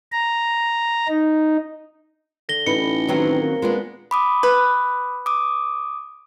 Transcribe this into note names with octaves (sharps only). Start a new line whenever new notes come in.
A#5
D#4
D3 A#6 G7
A1 D#4 B4 C#7
D#3 E3 F#3 C4
A#3
A#2 G#3 B3 D4
B5 D6 D#6
B4
D6 D#6